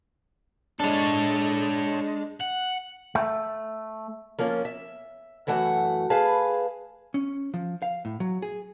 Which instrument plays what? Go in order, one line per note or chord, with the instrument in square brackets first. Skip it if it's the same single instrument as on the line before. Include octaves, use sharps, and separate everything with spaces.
[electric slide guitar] G#3 D4 [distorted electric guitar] A4 C#5
[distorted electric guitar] F#5
[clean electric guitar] A3
[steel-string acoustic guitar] F3 A#3 C#4 F4
E5
F#2 E3 A3 F#4 F#5
G#4 B4 F5 G#5 A5
[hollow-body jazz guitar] C#4
F3
F5
A2
F#3
G#4